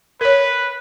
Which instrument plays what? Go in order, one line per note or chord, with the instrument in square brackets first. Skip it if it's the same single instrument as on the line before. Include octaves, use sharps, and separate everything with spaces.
[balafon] A#4 C#5 [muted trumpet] B4